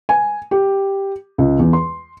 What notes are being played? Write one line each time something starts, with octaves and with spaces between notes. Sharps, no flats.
G#5
G4
C#2
E2
C6